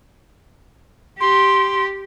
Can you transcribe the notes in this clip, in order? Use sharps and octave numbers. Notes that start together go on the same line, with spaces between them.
G4 C6